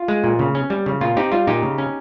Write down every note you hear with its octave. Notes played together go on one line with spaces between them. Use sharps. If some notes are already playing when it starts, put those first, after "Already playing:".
Already playing: F4
G#3
A#2
C#3
C#4
G3
C#3
A#2 F4
C4 D#4 G4
G3 F4
A#2 D#4 G4
C#3
C#4